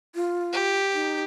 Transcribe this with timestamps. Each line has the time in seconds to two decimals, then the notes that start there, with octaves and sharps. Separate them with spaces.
0.15 F4
0.53 G4
0.94 D#4